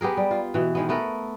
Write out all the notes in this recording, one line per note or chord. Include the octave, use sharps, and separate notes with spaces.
B3 G4 G#4 A#4
G3
F4
B2 E3
D#3 G#3 B3
A3 B3 A4 A#4